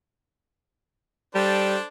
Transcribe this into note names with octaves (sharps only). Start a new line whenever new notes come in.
G3 D4 A4 C5